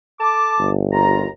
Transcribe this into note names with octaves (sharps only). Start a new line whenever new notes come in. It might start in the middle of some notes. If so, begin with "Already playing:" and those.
A4 A5 D6
G1
D#2 F4 A#5